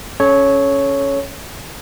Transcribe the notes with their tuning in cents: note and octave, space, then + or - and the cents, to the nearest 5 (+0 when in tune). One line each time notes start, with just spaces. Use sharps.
C#4 +0 A4 -35 C#5 +0